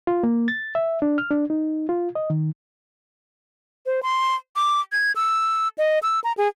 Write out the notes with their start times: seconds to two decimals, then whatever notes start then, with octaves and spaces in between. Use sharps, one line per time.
0.07 F4
0.23 A#3
0.48 A6
0.75 E5
1.02 D4
1.18 F6
1.30 D4
1.50 D#4
1.89 F4
2.15 D#5
2.30 D#3
3.86 C5
4.03 C6
4.56 D6
4.92 G#6
5.16 E6
5.78 D#5
6.03 E6
6.24 A#5
6.37 G#4